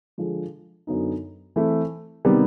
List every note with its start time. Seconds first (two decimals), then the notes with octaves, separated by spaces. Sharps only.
0.18 D3 F3 G#3
0.87 F#2 D3 F#3 B3 D#4
1.56 E3 A3 C4 E4
2.25 C3 D#3 G3 B3